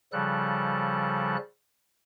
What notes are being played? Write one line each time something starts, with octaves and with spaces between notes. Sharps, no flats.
C#3 F3 G3 A4 F#6